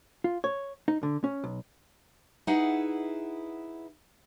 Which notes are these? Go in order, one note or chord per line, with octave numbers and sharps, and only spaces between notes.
F4
C#5
D#4
D3
C#4
B1
D#4 E4 G#4 B4 F#5